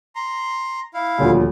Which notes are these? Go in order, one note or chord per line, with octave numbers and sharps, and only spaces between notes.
A#5 C6
E4 F5
D#1 D2 F3